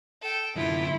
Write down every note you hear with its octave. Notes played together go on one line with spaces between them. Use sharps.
A4 G5
F#2 D3 E4 F4